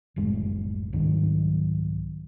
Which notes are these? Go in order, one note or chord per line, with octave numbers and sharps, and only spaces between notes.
F#1 C2 A2 G#3
C2 G#2 D#3 F#3